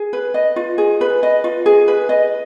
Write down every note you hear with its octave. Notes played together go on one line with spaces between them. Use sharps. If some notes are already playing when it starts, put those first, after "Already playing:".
Already playing: G#4
B4
D#5
F4
G#4
B4
D#5
F4
G#4
B4
D#5